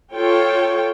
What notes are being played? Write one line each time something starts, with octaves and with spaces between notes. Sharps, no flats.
F4 A4 C#5 G5